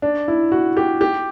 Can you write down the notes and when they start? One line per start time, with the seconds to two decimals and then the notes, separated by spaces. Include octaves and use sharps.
0.02 D4
0.28 E4
0.52 F#4
0.77 G4
1.01 G4